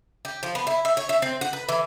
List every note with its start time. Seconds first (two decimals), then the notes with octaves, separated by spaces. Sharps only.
0.25 G4
0.43 F3
0.55 B3
0.67 E4
0.85 E5
0.97 C#5
1.09 E5
1.22 C4
1.41 F#5
1.53 B4
1.69 E3